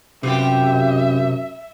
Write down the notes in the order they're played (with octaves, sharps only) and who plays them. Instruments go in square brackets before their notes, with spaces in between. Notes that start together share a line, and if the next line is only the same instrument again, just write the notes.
[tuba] F#2 [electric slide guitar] C3 [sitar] B3 F4 G4 [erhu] E5